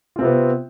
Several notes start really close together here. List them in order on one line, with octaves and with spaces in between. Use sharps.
F4 C4 C3 B3